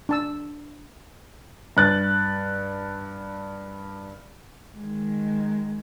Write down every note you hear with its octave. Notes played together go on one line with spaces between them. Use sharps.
D4 A5 E6
G2 F#6 A6
D#3 G#3